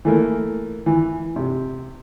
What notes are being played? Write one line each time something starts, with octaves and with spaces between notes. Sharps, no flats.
E3 A3 A#3
E3
C3